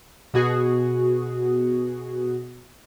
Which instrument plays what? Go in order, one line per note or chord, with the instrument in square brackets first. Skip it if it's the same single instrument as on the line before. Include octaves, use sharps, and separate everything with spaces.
[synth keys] B2 F#4 G#4